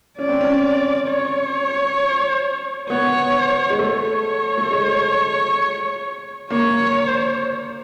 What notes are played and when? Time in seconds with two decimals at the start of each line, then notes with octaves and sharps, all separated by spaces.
0.18 C#4 D5
0.29 C4
0.41 C#4
1.09 C#5
2.89 B3 C#5
3.70 G#3
3.79 A3 C#5
4.58 A3
4.71 G#3
6.50 A#3 C#5